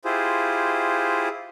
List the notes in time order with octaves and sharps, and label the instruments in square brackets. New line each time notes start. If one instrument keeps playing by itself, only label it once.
[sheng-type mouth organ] E4 F4 G4 G#4 C5